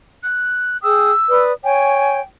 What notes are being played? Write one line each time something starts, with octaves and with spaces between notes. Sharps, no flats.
F#6
G#4 G5 D#6 E6
B4 D5 D#6
C#5 G5 G#5